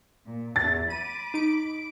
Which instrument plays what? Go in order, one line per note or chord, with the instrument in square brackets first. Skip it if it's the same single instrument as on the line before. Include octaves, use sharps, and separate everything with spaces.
[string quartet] A#2
[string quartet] E2 [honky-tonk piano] A6
[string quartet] B5 D6 [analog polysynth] D#7
[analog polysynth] D#4 D7